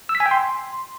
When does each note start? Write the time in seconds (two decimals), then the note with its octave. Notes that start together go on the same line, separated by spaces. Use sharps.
0.09 E6
0.15 B6
0.20 G#5
0.26 G5
0.31 C6